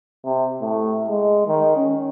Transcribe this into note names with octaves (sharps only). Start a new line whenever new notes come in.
C3
A2
G#3
D#3
C#4